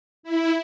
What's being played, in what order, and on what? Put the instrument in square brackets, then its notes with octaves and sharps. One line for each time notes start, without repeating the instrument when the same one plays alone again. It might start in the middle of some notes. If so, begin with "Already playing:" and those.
[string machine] E4